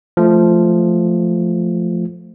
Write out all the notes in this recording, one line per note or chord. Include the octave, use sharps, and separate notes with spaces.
F3 A3